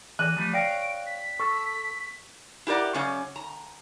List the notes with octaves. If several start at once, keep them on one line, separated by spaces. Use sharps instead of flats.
E3 F#6 D#7
F3 G3 A3
C#5 D5 F5 G5 A#6 D7
B6
A4 C#6
E4 G4 A#4 D5 F#5
F#2 C#3 C#4 D5
A#5